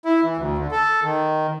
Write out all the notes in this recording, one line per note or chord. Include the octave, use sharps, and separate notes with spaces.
E4
E3
D2
D3
A4
D#3